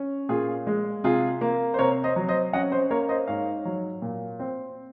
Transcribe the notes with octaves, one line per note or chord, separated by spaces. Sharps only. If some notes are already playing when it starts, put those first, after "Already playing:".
Already playing: C#4
A#2 F4 G#4
G#3
C3 F4 G#4
A#3
C5
C3 A#4 C#5
C5 D#5
F#3
C5 D#5
C#4 D#5 F#5
C5 D#5
A#3 A#4 C#5
C5 D#5
G#2 C#5 F5
F#3
A#2
C4